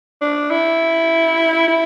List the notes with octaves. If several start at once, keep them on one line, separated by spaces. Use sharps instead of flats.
D4
E4
E4